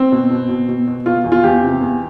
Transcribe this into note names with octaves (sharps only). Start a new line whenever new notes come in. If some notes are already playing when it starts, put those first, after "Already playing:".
Already playing: C4
B2
B2
B2
B2
B2
B2 F4
E2
F4
E2 G4
C3
E2